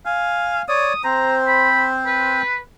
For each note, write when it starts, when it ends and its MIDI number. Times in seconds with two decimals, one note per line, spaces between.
0.06 0.62 77
0.06 0.62 80
0.69 0.93 73
0.69 0.93 74
0.69 1.00 87
1.04 2.42 60
1.04 2.42 72
1.04 1.38 82
1.47 1.84 83
2.06 2.58 71